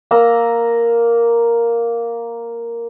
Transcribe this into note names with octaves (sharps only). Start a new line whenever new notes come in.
A#3 A#5 E6